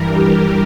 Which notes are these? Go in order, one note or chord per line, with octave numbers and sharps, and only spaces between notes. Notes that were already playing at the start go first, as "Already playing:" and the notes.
Already playing: G2 E3 G3 A#4
G4